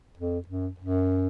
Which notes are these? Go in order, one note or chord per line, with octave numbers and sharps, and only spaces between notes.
F2
F#2
F#2